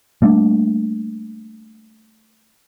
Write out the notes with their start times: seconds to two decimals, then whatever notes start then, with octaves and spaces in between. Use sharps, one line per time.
0.22 G3 A3 A#3 D4